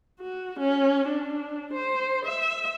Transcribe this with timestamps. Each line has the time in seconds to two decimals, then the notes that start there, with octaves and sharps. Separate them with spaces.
0.20 F#4
0.60 C#4
1.07 D4
1.73 C5
2.25 E5